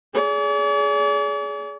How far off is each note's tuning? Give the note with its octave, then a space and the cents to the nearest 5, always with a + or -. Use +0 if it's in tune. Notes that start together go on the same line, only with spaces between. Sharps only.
G#4 +15 D5 -45